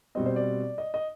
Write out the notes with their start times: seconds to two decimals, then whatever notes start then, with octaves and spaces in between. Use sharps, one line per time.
0.15 B2 G3 C4 D#5
0.26 C5
0.36 D5
0.78 D#5
0.94 D#5